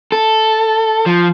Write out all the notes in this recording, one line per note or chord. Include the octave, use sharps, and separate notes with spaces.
A4
F3